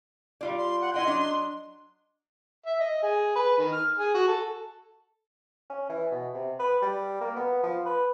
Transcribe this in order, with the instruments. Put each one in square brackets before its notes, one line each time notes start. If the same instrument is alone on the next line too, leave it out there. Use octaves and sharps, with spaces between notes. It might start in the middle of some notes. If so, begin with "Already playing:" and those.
[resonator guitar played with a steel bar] G3 F4 D5
[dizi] C6
F#5
[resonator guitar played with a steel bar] E4 D#5 G5 [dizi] C6
[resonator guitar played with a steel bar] F#3 D4 D#5
[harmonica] E5
D#5
G#4
B4
D#3
F6
G#4
F#4
A4
[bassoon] C#4
E3
B2
C3
B4
G3
A#3
B3
F3
B4